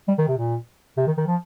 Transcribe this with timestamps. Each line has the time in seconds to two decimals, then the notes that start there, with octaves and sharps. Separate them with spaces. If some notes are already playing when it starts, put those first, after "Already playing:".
0.08 G3
0.18 D#3
0.28 C3
0.38 A#2
0.98 C3
1.07 D#3
1.17 D#3
1.27 F3